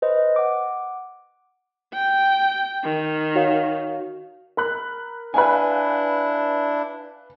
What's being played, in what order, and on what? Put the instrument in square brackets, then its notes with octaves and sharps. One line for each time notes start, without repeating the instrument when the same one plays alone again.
[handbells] B4 C5 D#5
F#5 D6
[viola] G5
D#3
[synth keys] F#4 C#5 F5
[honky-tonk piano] A#4 B5 F#6
[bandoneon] D4 E4 [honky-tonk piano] B4 F5 G#5